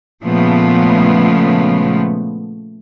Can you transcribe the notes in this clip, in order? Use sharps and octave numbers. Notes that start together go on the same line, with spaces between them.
A#2 C#3 F3 G#3 A3 B3